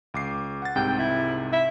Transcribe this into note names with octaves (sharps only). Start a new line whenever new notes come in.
C#2 D6 C7
F#5 A6
C2 G#2 C3 G5
E4
E5